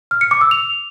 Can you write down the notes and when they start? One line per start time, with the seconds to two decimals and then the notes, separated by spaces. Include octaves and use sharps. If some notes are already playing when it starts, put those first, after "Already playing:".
0.11 F6
0.21 C#7
0.31 D6
0.41 E6
0.51 F7